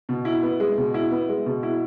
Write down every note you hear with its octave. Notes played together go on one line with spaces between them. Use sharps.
B2
E4
B3
G#3
B2
E4
B3
G#3
B2
E4